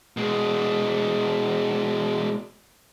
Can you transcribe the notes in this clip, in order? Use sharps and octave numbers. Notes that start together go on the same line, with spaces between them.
B2 G#3